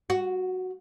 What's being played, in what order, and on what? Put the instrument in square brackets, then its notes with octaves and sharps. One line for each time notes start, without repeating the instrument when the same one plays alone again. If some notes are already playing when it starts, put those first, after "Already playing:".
[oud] F#4